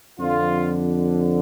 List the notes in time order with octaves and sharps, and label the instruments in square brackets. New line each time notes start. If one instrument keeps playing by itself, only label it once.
[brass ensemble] F2 D3 F4